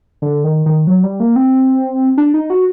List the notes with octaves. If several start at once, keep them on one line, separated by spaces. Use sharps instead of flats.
D3
D#3
D#3
F#3
G3
A#3
C4
D4
D#4
F#4